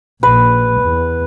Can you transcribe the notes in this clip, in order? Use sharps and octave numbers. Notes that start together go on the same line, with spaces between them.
A#1 B4
E2